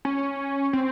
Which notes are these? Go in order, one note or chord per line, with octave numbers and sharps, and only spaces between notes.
C#4
C4